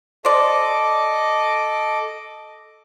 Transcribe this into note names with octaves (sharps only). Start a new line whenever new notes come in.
A4 C5 D5 D#5 D6